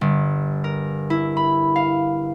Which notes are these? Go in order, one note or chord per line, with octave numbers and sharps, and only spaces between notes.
G1
A#4
E4
B5
F5